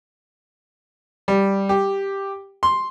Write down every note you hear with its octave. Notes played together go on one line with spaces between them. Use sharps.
G3
G4
C6